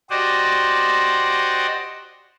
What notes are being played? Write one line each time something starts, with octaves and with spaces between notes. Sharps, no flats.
F#4 G4 C5 D5 D#5